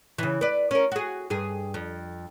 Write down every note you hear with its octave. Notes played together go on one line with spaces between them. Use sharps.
C#3 E3
B4 D5
C#4 A#4
F#4 G#4
G2 G#4
F2